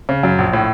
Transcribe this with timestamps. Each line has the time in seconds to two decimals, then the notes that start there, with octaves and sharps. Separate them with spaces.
0.09 C#3
0.23 F#2
0.38 A#1
0.53 A2